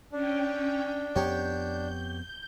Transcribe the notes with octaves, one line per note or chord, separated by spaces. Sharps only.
C#4 D4 G5
F2 B3 G4 C#5 G5 G6